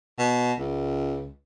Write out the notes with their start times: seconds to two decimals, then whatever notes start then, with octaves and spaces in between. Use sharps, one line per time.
0.19 B2
0.59 C#2